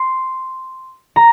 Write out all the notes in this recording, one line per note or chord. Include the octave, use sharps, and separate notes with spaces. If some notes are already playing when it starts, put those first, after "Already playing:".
Already playing: C6
A#5